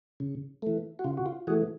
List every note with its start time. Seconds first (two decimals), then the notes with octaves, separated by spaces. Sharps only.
0.20 C#3
0.62 E3 A3
0.99 F#4
1.04 C#3 F4
1.17 F#4
1.26 F4
1.47 E3 A3 F#4 G#4